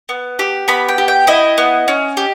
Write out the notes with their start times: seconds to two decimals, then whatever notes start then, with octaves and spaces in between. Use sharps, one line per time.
0.09 B3
0.39 G4
0.68 B3 B5
0.89 G5
0.98 G4
1.08 G5
1.27 E4 D#5
1.58 B3
1.88 C#4
2.17 G4